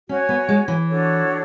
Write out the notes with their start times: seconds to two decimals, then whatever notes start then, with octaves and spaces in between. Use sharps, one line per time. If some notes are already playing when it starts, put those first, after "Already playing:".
0.09 C#4 F#4 C#5 G#5
0.29 B3
0.49 G#3
0.68 E3
0.87 D4 F#4 A4 C#5